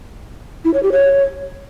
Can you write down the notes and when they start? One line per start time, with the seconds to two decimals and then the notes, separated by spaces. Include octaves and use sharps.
0.65 E4
0.74 C#5
0.83 G4
0.92 C#5